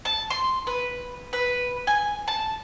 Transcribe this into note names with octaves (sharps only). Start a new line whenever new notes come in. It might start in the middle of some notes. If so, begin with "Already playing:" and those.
A5
C6
B4
B4
G#5
A5